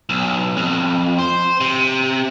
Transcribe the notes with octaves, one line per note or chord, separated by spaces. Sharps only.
B1
F2
C5
C3